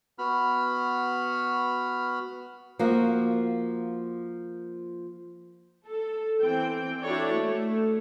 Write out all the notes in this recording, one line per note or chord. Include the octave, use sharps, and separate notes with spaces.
B3 F#4 B5 F6
F3 A#3 F#4
A4
E3 C4 G5
D4 E4 F#4 A4 C#5 D5
A3